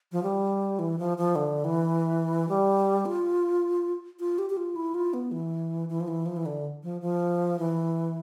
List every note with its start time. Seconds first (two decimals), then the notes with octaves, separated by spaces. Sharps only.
0.12 F3
0.23 G3
0.79 E3
0.99 F3
1.18 F3
1.36 D3
1.64 E3
2.49 G3
3.06 F4
4.20 F4
4.38 G4
4.50 G4
4.57 F4
4.76 E4
4.94 F4
5.14 B3
5.32 E3
5.89 E3
6.00 F3
6.08 E3
6.26 F3
6.37 E3
6.46 D3
6.83 F3
7.02 F3
7.59 E3